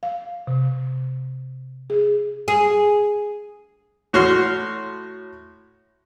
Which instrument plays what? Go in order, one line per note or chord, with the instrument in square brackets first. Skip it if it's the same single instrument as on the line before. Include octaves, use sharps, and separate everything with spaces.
[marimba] F5
C3
G#4
[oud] G#4
[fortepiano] A2 F#4 C#5 C6 F6